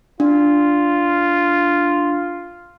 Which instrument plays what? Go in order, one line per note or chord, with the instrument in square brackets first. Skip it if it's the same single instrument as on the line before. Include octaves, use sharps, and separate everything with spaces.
[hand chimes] D4 [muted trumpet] F4